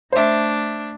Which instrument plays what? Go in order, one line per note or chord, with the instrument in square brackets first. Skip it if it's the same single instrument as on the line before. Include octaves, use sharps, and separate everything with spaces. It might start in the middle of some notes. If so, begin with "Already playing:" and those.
[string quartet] A3 D4 [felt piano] C5 E5